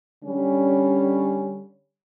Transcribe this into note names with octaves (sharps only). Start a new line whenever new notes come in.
D3 G3 C#4